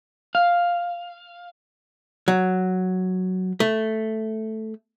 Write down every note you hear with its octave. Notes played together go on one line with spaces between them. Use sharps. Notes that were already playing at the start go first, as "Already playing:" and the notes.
F5
F#3
A3